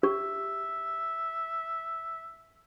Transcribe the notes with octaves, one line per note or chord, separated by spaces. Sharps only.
G4 E5